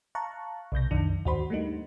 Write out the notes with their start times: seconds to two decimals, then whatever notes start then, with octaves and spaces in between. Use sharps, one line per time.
0.15 F5 A5 A#5 C#6 F#6
0.72 B1 C3 G6 A#6
0.91 C2 F#2 D#3 D4
1.25 D#2 G#2 F#4 C5 B5 C6
1.50 G3 A3 A#3 D4 D#4